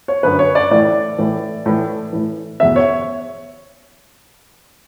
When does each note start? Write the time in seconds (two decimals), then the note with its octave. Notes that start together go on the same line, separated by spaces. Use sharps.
0.08 C#5
0.23 F#2 D3 B4
0.39 C#5
0.55 D5
0.71 A2 E3 D5
1.18 A2 E3
1.66 A2 E3
2.13 A2 E3
2.60 E2 B2 E5
2.76 C#5